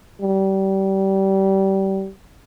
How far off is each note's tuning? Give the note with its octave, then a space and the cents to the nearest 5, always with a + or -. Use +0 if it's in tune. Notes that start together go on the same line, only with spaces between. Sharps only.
G3 -25